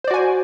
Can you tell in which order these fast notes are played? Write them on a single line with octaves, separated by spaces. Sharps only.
C5 D5 F#4 G#5